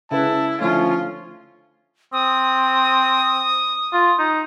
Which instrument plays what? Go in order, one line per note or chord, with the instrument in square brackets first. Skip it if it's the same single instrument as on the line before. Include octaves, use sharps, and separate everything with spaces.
[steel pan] C#3 B4 [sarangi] E4 [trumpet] A5
[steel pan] D3 A3 [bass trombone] F3 [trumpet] C#4 [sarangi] F4
[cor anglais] C4 [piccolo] D#6
[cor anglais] F4
D#4